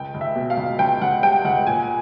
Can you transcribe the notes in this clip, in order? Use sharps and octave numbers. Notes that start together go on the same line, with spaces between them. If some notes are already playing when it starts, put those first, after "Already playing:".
Already playing: C#2 G5
C#2
E5
B2
F5
C#2
C#2 G5
C#2 F#5
G3 G5
C#2 F#5
A#2 G#5